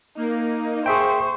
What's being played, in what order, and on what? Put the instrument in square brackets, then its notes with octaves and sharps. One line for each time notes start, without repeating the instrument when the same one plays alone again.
[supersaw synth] A#3 [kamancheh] D#4
[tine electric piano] G#4 E5 G5 [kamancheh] C5 C#6